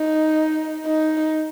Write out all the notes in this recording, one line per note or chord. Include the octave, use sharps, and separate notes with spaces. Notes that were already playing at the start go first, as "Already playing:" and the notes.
Already playing: D#4
D#4